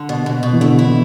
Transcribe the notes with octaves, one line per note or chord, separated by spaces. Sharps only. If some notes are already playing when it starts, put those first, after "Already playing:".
Already playing: D3
B2
B2
B2
E3
D3 A3
E4
E3